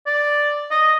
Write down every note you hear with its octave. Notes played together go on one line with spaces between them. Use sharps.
D5
D#5